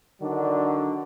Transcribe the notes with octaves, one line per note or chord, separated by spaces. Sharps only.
D3 D#3 F#3 D4